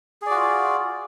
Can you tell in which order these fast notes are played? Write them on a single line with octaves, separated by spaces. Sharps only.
G#4 D5 F#4 F4